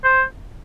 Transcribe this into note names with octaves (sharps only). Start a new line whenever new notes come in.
C5